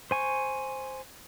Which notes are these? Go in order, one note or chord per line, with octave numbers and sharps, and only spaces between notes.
C5 G#5 C#6